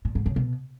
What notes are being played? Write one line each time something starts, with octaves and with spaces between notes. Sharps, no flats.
A#2
G#2
C#3
B2